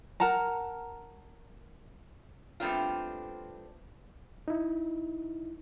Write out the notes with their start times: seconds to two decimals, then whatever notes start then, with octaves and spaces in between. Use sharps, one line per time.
0.20 A#4 F#5 A5 A#5
2.60 G3 A3 B3 C4 D4 F4
4.48 D#4 E4